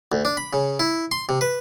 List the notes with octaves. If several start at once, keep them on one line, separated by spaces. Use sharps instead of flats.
D2
D4
B5
C#3
E4
C6
C3
B4